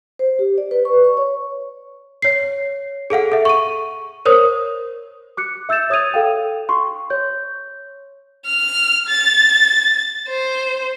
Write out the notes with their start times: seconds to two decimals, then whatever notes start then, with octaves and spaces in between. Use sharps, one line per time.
0.19 C5
0.39 G4
0.58 D5
0.71 B4
0.85 C#6
1.04 C#6
1.17 C#5
2.22 C#5 C7
3.10 G#4 A4 F5 F#5
3.32 A4 E5
3.45 C#6 D#7
4.25 A#4 C5 C#5 D#6
5.37 D6 F#6 C#7
5.69 E5 E6 G6 A6 E7
5.90 C#5 D#6 G#6 A6 D#7 F7
6.14 A4 F5 G5
6.69 C6 C#6
7.10 C#5 G6
8.46 F6
9.08 A6
10.28 C5